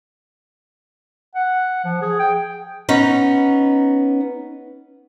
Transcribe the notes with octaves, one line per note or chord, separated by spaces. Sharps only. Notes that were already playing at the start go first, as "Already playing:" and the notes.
F#5
F3
G#4
G5
B3 C#4 D#4